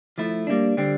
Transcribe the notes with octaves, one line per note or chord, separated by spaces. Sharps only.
F3 A3 E4
G3 A#3 D4
D3 G3 C4